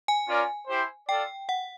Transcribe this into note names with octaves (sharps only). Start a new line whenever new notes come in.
G#5
C#4 F4 A#4 D5
E4 G4 C5
F4 A4 D5 G5
F#5